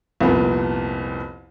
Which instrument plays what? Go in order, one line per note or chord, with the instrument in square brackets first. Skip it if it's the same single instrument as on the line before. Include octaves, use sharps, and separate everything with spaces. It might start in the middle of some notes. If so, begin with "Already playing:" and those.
[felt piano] C2 F2 A#2 B3